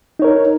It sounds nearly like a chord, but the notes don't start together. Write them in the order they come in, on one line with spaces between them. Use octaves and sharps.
D#4 C#5 A#4